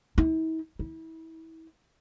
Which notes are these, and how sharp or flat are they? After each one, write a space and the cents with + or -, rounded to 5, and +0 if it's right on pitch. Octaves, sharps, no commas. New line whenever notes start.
E4 -45
E4 -30